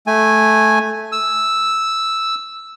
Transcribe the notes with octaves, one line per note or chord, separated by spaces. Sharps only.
A3 G#5
E6